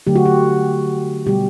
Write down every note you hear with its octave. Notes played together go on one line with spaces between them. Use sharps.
D3 F#3 A3 G4
F#4
G4
B2 G3 G4